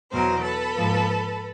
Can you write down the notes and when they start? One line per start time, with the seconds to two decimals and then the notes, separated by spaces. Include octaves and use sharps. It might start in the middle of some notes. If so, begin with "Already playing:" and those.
0.11 E2 B2 F#3 A#4 C5
0.43 A4 B4
0.74 G#2 F3 A#3